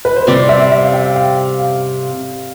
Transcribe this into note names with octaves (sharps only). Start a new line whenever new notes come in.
B4
C5
C3 G3 C4 D5
E5
E5
F5
G5
F5
F5
F5